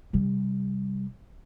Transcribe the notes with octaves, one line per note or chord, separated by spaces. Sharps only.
C3 G3